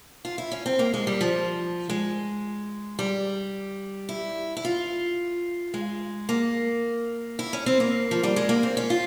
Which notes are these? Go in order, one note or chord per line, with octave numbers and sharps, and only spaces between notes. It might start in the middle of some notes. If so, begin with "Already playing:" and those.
F4
E4
C#4
C4
A#3
G#3
G3
F3
G#3
G3
E4
E4
F4
G#3
A#3
E4
C#4
C4
A#3
F3
G3
G#3
A#3
C4
C#4
F4